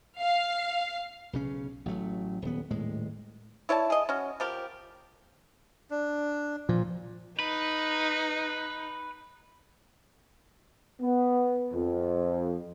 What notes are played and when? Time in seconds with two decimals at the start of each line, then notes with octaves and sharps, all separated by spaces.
0.21 F5
1.33 B1 C#3 C#4
1.85 A1 F#3 A3
2.42 D#1 B3
2.70 D#1 A2 G#3
3.69 E4 C#5 D5 A5
3.90 G#4 D#5
4.09 C#4 F#4
4.40 F3 G4 A#4
5.90 D4
6.69 A#2 F3
7.40 D#4 B4
11.01 B3
11.73 F2